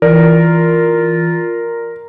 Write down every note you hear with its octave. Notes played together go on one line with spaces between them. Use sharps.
E3 F4 A#4 D5